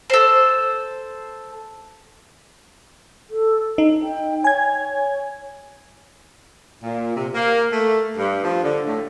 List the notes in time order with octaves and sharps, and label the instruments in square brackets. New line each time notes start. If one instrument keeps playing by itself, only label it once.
[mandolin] A4 C5
[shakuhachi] A4
[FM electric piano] D#4
[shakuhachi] G5
[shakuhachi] C#5 [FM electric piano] G#5 G#6
[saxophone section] A#2
C3
A#3
A3
G2
F3
D3
A2